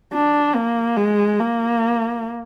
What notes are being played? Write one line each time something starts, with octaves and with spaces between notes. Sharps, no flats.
D4
A#3
G#3
A#3